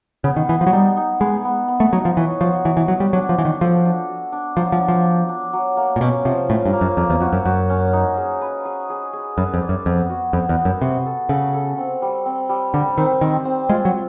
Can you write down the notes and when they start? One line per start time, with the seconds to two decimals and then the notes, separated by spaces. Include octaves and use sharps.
0.24 C#3 B3
0.37 D#3
0.49 E3 B3
0.61 F3
0.67 F#3
0.72 G3 D#4
0.97 D#4
1.20 G#3 B3
1.45 B3
1.68 B3
1.80 A3
1.92 F#3 D#4
2.05 F3
2.17 E3 C#5
2.40 F3 F#4
2.65 E3 F#4
2.77 E3
2.88 F#3 C#5
3.00 G3
3.13 F#3 D4
3.29 F3
3.37 E3 F#4
3.45 D#3
3.61 F3 A4
3.85 D4
4.09 F#4
4.32 D4
4.57 F3 F#3
4.72 F3
4.81 D4
4.88 F3
5.04 D4
5.29 D4
5.53 F#3
5.77 A#3
5.96 A#2
6.01 B2 C#4
6.25 C3 F3
6.49 A2 C#4
6.66 G2
6.73 A#3
6.81 F#2
6.97 F2 A#3
7.10 E2
7.21 F2 F#4
7.33 F#2
7.45 F#2 F#4
7.70 C#4
7.93 D#4
8.17 G#4
8.41 B4
8.65 G#4
8.90 G#4
9.13 G#4
9.37 F#2 B4
9.54 F2
9.62 D5
9.69 F#2
9.86 F2 B3
10.10 F#4
10.33 F2 B3
10.49 E2
10.57 B3
10.65 F#2
10.81 C3 F#4
11.06 A4
11.29 C#3 A4
11.54 A4
11.78 C4
12.02 G3
12.26 C4
12.49 G3
12.74 D3 G3
12.97 D#3 C4
13.21 D#3 C4
13.45 C4
13.69 G#3 F4
13.85 F#3